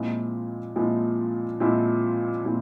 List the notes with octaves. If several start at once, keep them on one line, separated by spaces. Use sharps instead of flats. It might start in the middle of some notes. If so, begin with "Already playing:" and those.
Already playing: A#2 F3 G#3 C4 E4
A#2 F3 G#3 C4 E4
A#2 F3 G#3 C4 E4
A#2 F3 G#3 C4 E4